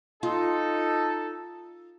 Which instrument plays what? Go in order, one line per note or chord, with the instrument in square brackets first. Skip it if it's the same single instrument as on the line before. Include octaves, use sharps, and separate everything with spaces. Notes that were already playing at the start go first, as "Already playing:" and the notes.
[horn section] D#4 A4 [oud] F4